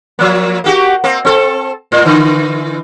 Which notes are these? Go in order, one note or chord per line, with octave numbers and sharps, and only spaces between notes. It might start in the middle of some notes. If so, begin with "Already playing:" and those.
F3 A#3
A#3 F#4 G4
A#3 C4
C4 A4
A2
D3 E3